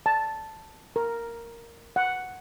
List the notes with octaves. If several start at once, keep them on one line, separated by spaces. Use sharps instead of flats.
A5
A#4
F#5